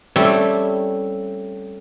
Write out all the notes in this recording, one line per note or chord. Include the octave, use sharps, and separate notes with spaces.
G3 A3 C4 C#4 E4